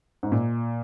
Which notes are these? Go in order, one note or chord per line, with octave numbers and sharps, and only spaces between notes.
G#2
A#2